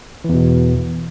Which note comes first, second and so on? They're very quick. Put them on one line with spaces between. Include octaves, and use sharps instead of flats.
E3 E2 B2